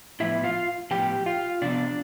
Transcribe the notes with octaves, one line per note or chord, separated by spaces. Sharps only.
A2 F3 B3 E4 E5
F4 F5
A2 F3 B3 G4 G5
F4 F5
C3 F3 B3 D4 D5